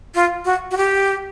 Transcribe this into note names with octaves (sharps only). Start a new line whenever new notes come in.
F4
F#4
F#4
G4